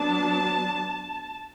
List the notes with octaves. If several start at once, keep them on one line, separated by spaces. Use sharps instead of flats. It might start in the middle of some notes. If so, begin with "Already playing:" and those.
Already playing: F#3 B3 D4 A5